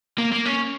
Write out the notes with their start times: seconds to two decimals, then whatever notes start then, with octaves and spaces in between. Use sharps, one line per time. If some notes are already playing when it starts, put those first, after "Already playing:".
0.18 A#3
0.32 A#3
0.46 C#4